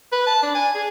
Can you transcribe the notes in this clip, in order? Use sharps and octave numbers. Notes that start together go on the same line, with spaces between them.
B4
A5
D4
G#5
G#4